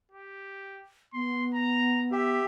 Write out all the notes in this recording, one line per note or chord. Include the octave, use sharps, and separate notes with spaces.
G4
B3 C6
A#5
G4 E5